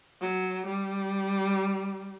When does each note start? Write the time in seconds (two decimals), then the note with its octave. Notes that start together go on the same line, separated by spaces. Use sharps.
0.21 F#3
0.66 G3